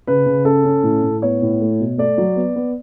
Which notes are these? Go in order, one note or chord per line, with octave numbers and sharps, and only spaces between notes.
C#3 B4
C#3
C#4 A4
C#4
A2
A2
B3 C#5
A2
A3
B2
A3 D5
F#3
B3
B3